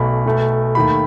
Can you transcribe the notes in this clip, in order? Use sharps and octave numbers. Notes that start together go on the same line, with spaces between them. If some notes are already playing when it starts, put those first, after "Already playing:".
Already playing: B1 B2 A3 B5
B1 B2 A3
D#2 D#3 A3 B5